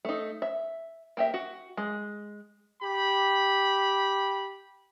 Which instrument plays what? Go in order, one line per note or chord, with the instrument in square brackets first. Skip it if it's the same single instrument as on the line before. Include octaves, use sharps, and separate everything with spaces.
[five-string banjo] A3 D#4
E5
A#3 G4 E5
F#4
G#3
[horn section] G4 B5